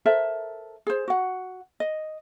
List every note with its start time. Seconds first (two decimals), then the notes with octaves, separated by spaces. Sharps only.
0.06 A4 A#4 C5 E5
0.87 G#4 C5
1.08 F#4 F#5
1.80 D#5